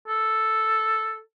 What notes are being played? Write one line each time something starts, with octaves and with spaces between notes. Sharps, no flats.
A4